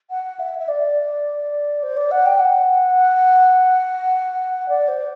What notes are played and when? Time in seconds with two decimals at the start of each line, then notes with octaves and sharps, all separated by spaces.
0.10 F#5
0.39 E5
0.59 E5
0.68 D5
1.83 C5
1.97 D5
2.11 F#5
2.26 G5
2.40 F#5
4.69 D5
4.88 C5